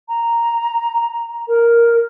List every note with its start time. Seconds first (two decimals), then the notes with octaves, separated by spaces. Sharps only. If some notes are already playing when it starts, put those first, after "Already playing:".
0.09 A#5
1.48 A#4